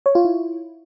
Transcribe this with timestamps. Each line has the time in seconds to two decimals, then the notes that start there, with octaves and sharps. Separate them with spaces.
0.06 C#5
0.15 F4
0.25 E4